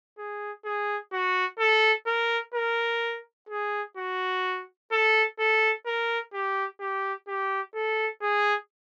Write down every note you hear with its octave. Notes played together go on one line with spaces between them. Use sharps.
G#4
G#4
F#4
A4
A#4
A#4
G#4
F#4
A4
A4
A#4
G4
G4
G4
A4
G#4